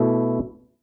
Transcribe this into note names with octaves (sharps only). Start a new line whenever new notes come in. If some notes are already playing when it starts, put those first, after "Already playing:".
Already playing: B2 A3 E4 A4